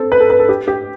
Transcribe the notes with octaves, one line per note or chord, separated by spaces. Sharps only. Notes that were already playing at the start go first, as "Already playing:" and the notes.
Already playing: C4 A4
B4
A4
B4
A4
G4
G4